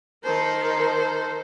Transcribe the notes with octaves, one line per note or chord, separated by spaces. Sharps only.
D#3 A4 A#4 C5